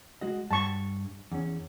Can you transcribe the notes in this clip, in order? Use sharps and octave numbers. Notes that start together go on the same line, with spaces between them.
G#3 F#4 D#5
G2 A5 C#6
E2 C#4